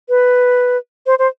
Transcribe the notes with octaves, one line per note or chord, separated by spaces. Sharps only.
B4
C5
C5